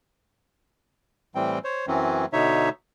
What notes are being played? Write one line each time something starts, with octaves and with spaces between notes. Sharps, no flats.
A2 E3 G3 C4 G5
C5 C#5
F#2 E3 F#3 C4 C#4
B2 D3 D#4 C#5 E5